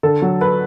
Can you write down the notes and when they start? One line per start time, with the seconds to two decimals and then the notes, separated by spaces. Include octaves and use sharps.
0.03 D3 A4
0.22 F#3
0.41 B4